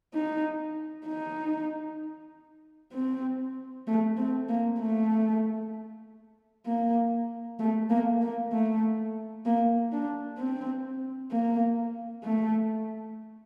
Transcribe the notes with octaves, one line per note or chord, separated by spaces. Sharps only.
D#4
D#4
C4
A3
C4
A#3
A3
A#3
A3
A#3
A#3
A3
A#3
D4
C4
A#3
A3